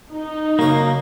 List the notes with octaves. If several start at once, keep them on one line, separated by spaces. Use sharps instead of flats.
D#4
F#2 C#3 A#3 C#6